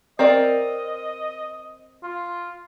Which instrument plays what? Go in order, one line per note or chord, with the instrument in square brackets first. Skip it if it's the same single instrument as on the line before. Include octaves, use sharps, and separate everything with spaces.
[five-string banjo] C4 A#4 D5 [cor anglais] D#5
[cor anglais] F4